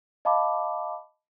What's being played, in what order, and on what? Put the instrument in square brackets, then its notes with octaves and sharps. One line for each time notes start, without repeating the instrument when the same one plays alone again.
[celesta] D#5 F5 A5 B5 D6